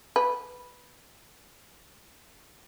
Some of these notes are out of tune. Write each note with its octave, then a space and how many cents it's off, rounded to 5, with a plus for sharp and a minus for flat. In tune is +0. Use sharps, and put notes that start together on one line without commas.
B4 -5